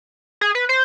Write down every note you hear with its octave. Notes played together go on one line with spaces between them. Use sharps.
G#4
B4
C5